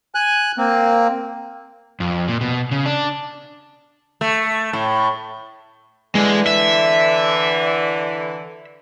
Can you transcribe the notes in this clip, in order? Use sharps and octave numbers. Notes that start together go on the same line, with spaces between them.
G#5 F#6
A#3 C4
F2
A#2
B2
C#3
D4
A3
A2
D3 E3 G#3
E5